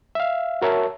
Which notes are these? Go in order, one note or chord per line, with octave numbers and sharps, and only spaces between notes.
E5 F5
F#4 A#4 C#5 E5 A5